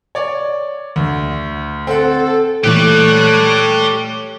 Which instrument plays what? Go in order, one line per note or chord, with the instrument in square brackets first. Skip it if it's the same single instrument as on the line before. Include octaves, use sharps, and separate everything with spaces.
[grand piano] C#5 D5
D2
[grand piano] C4 F#5 [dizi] A4
[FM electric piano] A#2 E3 A3 [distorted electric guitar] G4 D5 [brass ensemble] A4 C#5 [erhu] F#6